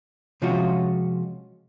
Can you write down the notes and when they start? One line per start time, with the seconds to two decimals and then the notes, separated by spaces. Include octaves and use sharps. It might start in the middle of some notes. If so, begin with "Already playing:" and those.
0.42 C3 F3 G#3 C#4 F4 F#4